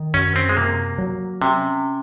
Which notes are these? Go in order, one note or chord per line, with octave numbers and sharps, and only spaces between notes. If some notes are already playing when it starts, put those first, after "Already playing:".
Already playing: D#3
F#2 C#4
C4
G#3
C3 A#3
F#3
C3 C#4